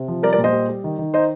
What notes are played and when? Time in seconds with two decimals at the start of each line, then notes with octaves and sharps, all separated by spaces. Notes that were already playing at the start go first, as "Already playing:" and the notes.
Already playing: C3
0.08 F3
0.23 G3 A#4 D5
0.33 A#4 D5
0.38 A#2
0.44 C5 D#5
0.53 G3
0.69 G3
0.84 D#3
0.98 D#3
1.14 D#4 C5 D#5